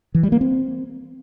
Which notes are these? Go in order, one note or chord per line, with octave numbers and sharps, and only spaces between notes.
E3
G3
A#3
C4